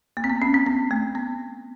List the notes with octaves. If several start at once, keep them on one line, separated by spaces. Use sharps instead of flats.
A#3
C4
B3
C#4
C4
B3
A3
B3